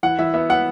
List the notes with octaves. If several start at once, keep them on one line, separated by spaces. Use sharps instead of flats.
E3 F#5
E3 E5
B3 E5
B3 F#5